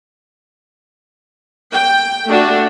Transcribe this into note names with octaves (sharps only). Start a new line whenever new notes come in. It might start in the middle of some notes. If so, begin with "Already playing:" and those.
G5
A3 D4 F#4